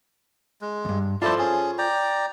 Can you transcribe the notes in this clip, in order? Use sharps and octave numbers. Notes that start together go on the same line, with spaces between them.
G#3
E2 G2
E4 F4 A4 C5 D5 A5
C#4 G#4
D5 G5 A#5